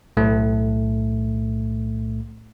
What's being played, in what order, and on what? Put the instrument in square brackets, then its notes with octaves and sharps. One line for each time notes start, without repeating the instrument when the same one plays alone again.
[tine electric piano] B1 A2 A3